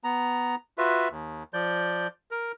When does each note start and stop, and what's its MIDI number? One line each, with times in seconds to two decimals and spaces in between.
0.04 0.55 59
0.04 0.55 82
0.78 1.09 65
0.78 1.09 66
0.78 1.09 71
0.78 1.09 76
1.10 1.43 39
1.54 2.07 53
1.54 2.07 74
1.54 2.07 91
2.31 2.52 70